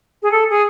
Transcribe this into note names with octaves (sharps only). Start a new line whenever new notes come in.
G#4
A4
G#4